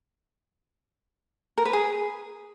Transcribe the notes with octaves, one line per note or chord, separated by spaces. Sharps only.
A#4
B4
G#4